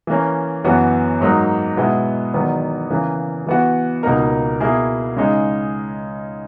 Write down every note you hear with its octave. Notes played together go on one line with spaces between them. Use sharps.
E3 A#3 C#4
F#2 E3 B3 F#4
G#2 F#3 A#3 D#4
B2 G#3 B3 E4
E2 D#3 F#3 B3
C#3 E3 A#3
E3 B3 F#4
C#2 B2 A#3 D#4 A#4
B2 A#3 E4 G#4
C#3 G#3 D#4